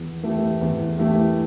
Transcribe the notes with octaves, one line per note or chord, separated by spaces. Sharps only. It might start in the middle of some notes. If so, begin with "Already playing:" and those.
Already playing: E2
E3 A3 E4 G4
E2
E3 A3 E4 G4